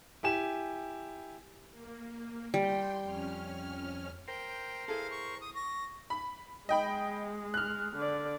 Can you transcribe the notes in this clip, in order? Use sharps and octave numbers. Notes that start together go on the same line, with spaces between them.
E4 G4 G#5 E7
A#3
G3 G5 C6
F2 C#4 F6
A#4 C5 G5
E4 G#4 A4 F5
C#6
D#6
C#6 A#6
B5
G#3 D#5 G5 B5
F6 F#6
D3 D5